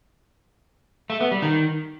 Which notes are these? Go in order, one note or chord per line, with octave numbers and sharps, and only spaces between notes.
A3
B3
G3
D#3